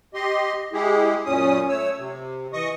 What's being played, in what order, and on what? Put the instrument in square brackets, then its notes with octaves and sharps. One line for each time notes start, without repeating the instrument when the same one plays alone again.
[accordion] G4 D#5 C6
G#3 E4 G4 G#4
F#2 A#2 C#4 D#6
A3 C#5 E6
C3
E3 D#5 C#6 D#6